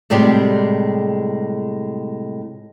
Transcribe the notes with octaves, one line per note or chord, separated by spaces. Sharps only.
A2 C3 G3 G#3 G4 D5